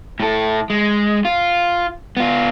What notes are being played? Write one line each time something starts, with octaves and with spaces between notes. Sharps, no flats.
A2 A4
G#3
F4
B3 F4